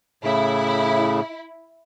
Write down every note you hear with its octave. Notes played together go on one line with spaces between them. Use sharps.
A2 C#3 E4